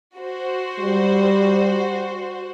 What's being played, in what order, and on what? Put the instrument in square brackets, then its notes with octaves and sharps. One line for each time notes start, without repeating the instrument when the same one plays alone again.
[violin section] F#4 C5
[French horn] G3